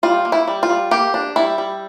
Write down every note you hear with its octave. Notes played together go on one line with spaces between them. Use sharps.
G3 F4
A#3
E4
G3
F4
G3
A#3 G4
D4
G3 E4
G3